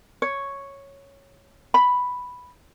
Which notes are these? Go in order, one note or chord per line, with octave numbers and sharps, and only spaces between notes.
C#5
B5